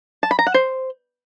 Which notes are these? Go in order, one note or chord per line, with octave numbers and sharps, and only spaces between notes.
A5
B5
A#5
F#5
C5